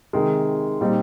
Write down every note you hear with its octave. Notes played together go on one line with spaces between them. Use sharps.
C3 D#3 G#3
A#2 G3 C4 D#4